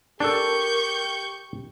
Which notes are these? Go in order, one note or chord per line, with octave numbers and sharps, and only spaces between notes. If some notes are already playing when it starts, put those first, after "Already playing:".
D4 G4 A4 A#4 C#6 G6